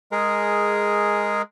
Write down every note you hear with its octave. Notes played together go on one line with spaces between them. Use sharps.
G#3 G#4 A#4